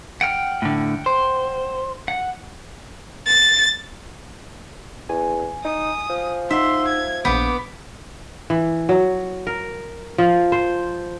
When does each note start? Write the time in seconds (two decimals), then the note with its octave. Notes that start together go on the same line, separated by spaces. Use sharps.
0.21 F#5 G5 F6
0.62 A2 D3
1.06 C5
2.08 F#5
3.27 A6
5.09 E2 G#5
5.65 D#4 D#6
6.10 F3
6.51 D#4 E5 F#5 C6
6.88 G#6
7.25 A#1 B3 F#5 D6 G6
8.50 E3
8.89 F#3
9.47 A#4
10.18 F3
10.52 C5